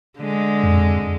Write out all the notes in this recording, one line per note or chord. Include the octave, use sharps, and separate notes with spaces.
D3 G#3
F2